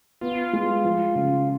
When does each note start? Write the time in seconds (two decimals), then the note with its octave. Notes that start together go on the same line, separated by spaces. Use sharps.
0.21 B3 F4
0.53 G#3
0.84 F3
1.15 C#3